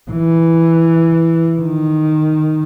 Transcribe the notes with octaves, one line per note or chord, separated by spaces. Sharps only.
E3
D#3